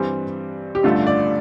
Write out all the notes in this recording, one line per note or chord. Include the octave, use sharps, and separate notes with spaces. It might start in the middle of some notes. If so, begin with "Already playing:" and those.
Already playing: G2 E3 G3 C4
G4
A1 G2 D3 A3 F4
D5